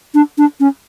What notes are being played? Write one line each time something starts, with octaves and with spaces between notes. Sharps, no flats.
D4
D4
C#4